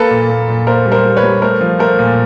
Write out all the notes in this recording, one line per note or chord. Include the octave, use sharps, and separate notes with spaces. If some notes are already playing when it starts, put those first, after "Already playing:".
Already playing: A#3 A4 B4
A#2
A#3
A#2
A#3 A#4 C5
G3
A#4 C5
G3
B4 C#5
G3
A3 A#4 C5
F3
A3 A#4 C5
A#2